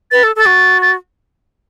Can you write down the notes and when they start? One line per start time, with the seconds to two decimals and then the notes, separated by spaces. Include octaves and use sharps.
0.11 B4 A6
0.23 A4
0.36 A4
0.39 A6
0.47 F#4
0.82 A6